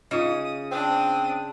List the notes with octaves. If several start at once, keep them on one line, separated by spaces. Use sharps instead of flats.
C#3 D#4 F4 D#5 D#6
C4 D4 D#6